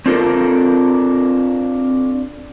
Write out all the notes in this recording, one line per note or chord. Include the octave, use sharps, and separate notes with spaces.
C4 D4 F4 A4 A#4